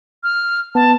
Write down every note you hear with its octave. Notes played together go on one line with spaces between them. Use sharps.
F6
B3 A5